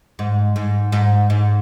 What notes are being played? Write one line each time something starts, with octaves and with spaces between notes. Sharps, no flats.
G#2
G#2
G#2
G#2